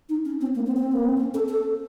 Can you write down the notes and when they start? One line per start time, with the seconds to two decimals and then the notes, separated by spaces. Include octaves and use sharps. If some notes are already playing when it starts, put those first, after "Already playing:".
0.09 D#4
0.25 C#4
0.41 C4
0.55 A#3
0.67 C4
0.77 C4
0.92 A#3
1.05 C4
1.18 C#4
1.34 A4
1.49 A4